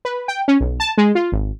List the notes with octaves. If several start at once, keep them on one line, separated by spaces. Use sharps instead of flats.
B4
G5
C#4
B1
A5
G#3
F4
G#1